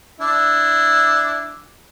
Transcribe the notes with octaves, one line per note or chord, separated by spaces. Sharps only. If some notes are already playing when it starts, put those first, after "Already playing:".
D4 E4